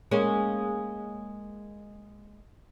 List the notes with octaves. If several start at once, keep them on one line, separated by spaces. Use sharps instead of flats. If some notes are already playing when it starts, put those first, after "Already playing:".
G#3 A#3 C#4